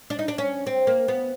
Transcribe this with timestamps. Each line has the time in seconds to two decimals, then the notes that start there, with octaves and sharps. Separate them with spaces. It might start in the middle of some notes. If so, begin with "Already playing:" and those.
0.10 D4
0.19 D#4
0.28 D4
0.38 C#4
0.67 C4
0.87 A#3
1.08 B3